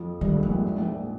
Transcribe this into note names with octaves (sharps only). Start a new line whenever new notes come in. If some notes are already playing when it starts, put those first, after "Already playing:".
Already playing: F2 F3
G2 D#3 G3
G#2 G#3
F3
A#1 A#2
G#2
A#1 A#2
A#1 A#2